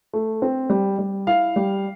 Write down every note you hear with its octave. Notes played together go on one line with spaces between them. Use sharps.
A3
C4
G3
G3
E4 F5
G3